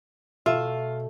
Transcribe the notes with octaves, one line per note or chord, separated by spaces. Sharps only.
B2 A3 F4 E5 G5